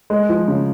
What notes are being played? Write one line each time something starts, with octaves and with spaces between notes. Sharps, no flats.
G#3
F3
C#3